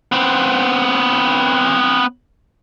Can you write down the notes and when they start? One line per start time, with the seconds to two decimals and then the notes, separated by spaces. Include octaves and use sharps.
0.12 B3 C4